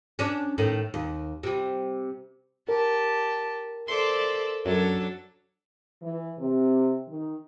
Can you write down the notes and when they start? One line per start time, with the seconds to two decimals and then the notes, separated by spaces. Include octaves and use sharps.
0.19 C#4 D4
0.58 A2 D#3
0.94 D#2
1.43 C3 G3
2.69 G4 A#4 A5
3.88 A4 C5 D5 E5 C6
4.65 F#2 F#3 D4 A4 C#5
6.02 E3
6.39 C3
7.09 D#3